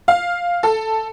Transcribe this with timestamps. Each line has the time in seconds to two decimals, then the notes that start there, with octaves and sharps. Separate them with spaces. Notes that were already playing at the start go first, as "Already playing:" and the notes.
0.08 F5
0.63 A4